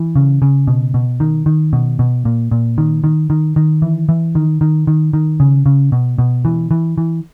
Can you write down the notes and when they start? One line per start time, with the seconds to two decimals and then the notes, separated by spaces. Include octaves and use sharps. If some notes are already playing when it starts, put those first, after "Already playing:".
Already playing: E3
0.16 C#3
0.42 C#3
0.67 B2
0.94 B2
1.20 D#3
1.46 D#3
1.73 B2
1.99 B2
2.25 A#2
2.51 A#2
2.78 D#3
3.04 D#3
3.30 D#3
3.56 D#3
3.82 E3
4.09 E3
4.35 D#3
4.61 D#3
4.87 D#3
5.13 D#3
5.40 C#3
5.66 C#3
5.92 B2
6.19 B2
6.45 E3
6.71 E3
6.98 E3